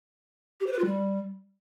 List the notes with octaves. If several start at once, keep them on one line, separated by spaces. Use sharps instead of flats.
G4
C5
B4
F4
G3